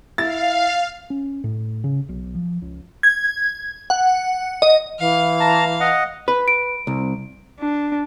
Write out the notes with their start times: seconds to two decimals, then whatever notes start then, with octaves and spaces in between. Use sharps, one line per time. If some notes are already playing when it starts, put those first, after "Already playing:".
0.18 E4 F5 A6
1.10 C#4
1.44 A2
1.84 C#3
2.09 B1
2.35 F3
2.62 C#2
3.03 G#6
3.90 F#5
4.62 D#5
4.99 E3 F5
5.40 A5 A#5
5.80 D#5 F#5
6.28 B4
6.48 D7
6.87 C2
7.60 D4